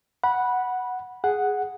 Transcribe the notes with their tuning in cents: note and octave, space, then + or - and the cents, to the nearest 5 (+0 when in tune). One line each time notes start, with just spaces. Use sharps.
F#5 +0 B5 -15
G#4 +0 F#5 +0